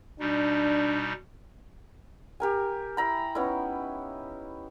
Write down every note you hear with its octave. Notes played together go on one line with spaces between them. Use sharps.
B2 G3 D4 D#4
G4 A#4 G#5
E4 A#5 B5
B3 C#4 D#4 E4